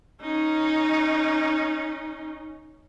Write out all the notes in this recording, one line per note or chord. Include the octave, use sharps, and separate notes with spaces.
C#4 D#4